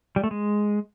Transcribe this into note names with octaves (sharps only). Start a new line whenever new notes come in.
G3
A3
G#3